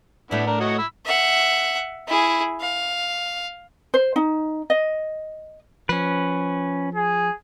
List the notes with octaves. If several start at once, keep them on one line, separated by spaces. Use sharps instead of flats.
A2 A3 B3 D4 E4
D4 A#4
F#4 C#5 D#5
B5 E6
E5 F#5
E4 G#4
F5
C5
D#4
D#5
F3 C#4 B4
G#4